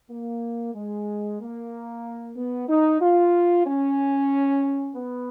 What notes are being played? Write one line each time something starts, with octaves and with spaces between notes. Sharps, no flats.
A#3
G#3
A#3
B3
D#4
F4
C#4
B3